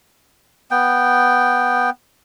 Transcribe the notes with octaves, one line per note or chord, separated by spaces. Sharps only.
B3 G5